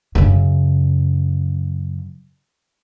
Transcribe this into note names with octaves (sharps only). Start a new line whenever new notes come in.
F#2 C#3